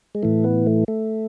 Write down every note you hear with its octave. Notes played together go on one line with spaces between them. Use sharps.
G#3
A2 E3 A3
B3
A3
A3